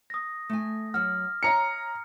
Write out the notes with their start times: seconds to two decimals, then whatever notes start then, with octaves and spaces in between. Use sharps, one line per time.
0.10 D#6 A#6
0.49 A3 G#5
0.94 F#3 F#5 F6
1.43 C#5 E5 A#5 C#7